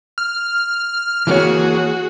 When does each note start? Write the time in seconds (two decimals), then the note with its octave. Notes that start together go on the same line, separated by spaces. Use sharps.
0.18 F6
1.27 E3 A#3 F#4 G#4 C#5